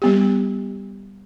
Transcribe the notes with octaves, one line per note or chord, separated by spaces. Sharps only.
G3 B3 G4